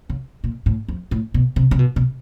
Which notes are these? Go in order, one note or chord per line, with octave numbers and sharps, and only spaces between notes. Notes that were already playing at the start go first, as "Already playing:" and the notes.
C#3
A#2
A2
F2
A2
B2
C3
C3
B2
B2